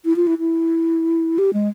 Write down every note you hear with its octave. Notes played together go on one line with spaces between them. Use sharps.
E4
F4
E4
E4
G4
G#3